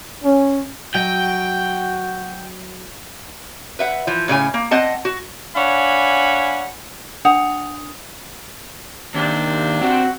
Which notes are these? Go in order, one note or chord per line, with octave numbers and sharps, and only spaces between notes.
C#4
F#3 F#4 D#5 G5
B4 E5 F#5
E3 F3
A2 C#3 F4 G#5
A#3
C4 D#5 F#5 A5
F#4
D4 C#5 F5 F#5 G#5 B5
D4 F#5 D#6 F7
D#2 C3 D4
C4 F#4